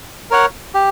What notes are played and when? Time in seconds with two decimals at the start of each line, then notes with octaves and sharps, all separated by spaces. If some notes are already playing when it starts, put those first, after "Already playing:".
0.31 A#4 C#5 F#5
0.74 G4